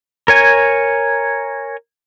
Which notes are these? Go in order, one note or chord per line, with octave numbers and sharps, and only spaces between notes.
A#4 C#5 G#5